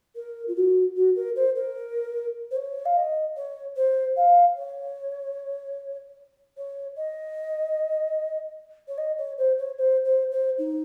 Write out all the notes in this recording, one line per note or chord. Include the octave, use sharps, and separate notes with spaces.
A#4
F4
F#4
F#4
A#4
C5
A#4
C5
C#5
F5
D#5
C#5
C5
F5
C#5
C#5
D#5
C#5
D#5
C#5
C5
C#5
C5
C5
C5
D#4